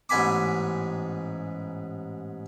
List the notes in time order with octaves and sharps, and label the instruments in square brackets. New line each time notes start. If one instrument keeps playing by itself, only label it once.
[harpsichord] A1 G#2 B3 G#5 B5 D6